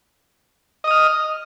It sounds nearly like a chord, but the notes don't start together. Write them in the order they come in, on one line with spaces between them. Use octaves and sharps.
D#5 D#6 F6